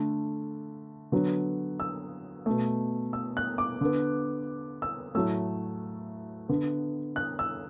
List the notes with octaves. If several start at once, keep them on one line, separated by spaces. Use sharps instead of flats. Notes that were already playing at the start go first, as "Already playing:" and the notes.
Already playing: D3 A3
D3 F#3 B3
E6
B2 A3
E6
F#6
D6
D3 B3
E6
A2 F#3 A3 E6
D3 B3
F#6
E6